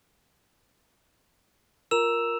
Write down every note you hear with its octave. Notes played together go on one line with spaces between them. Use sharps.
F4 A#4 A#5 E6 E7 F7